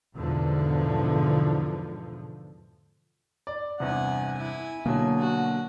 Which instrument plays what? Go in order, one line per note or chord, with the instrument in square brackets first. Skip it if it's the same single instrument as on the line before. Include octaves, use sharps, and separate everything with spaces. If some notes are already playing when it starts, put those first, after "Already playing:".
[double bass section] E2 G#2 B2 D3 F3
[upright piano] D5
[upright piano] E2 G2 C3 [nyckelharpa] F#5 G#5
[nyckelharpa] E4 G#5
[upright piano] B2 D3 F#3 [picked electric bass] A#3 [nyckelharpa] G#5
[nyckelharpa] F#4